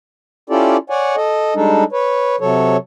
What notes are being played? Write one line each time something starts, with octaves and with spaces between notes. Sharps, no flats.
C#4 E4 F4 G4 A4 D5
C#5 D5 F#5 G#5
A4 D#5
G3 G#3 D4 D#4 A4
B4 C#5
C3 F#3 A4 C#5